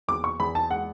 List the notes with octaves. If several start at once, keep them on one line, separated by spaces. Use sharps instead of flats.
E2 D6
C#6
E2 B5
A5
G#3 F#5